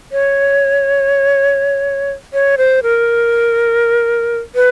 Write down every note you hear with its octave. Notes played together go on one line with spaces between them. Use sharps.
C#5
C#5
C5
A#4
B4